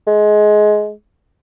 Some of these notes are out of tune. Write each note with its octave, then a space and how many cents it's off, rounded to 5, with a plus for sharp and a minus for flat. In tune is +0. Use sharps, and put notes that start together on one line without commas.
G#3 +20